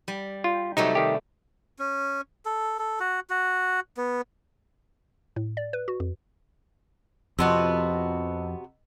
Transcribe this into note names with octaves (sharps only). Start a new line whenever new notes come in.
G3
F4
C3 F#3 G3 A3 D#4
D#3 G4
C#4
A4
A4
F#4
F#4
B3
A2
D5
B4
F#4
F2
F2 C3 F3 B3 F#4 D#5 A5 E6